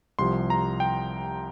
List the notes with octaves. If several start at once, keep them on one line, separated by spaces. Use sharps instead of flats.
C2 C3 F3 C6
A#5
G5